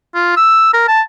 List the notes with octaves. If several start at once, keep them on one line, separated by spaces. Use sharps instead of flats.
F4
E6
A#4
A5